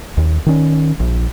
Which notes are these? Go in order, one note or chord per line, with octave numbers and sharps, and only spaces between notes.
D#2
D#3 C#4
A#1